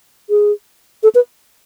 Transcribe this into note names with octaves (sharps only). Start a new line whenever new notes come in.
G#4
A4
B4